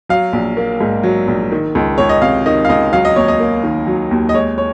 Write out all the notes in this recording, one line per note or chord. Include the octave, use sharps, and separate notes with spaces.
F#3 F5
A#1
A#3
G#2
F#3
A#1
D#3
C#2
C#2 C#5
D#5
C3 F5
D#3 D#5
F5
C#2 D#5
F#3 F5
D#5
D#2 C#5
D#5
A#3
D#3
F#3
D#2
D#5
G#3 C#5
C#5